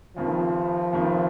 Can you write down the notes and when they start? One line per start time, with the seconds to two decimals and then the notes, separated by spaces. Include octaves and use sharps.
0.16 F1 F2 D#3 F3
0.93 F1 F2 D#3